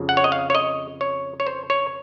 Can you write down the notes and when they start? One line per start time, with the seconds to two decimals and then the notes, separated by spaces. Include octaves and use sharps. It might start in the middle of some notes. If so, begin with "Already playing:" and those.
Already playing: F2 C#3 F3
0.09 F#5
0.17 C#5
0.24 D#5
0.32 F5
0.50 C#5
0.55 D#5
1.01 C#5
1.40 C#5
1.47 C5
1.70 C#5